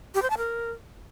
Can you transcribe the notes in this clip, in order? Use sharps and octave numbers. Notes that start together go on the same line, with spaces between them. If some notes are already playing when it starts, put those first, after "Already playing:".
G4
C5
A5
A#4